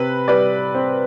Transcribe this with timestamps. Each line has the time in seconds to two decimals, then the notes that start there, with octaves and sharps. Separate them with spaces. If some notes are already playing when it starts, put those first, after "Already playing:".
Already playing: C3 B4
0.28 G3 B4 D5
0.75 C4